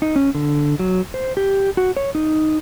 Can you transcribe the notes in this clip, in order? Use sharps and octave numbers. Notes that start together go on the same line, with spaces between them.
D#4
C#4
D3
F#3
C5
G4
F#4
C#5
D#4